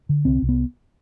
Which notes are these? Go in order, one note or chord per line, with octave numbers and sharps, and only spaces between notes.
D3
C2 C4
C2
B3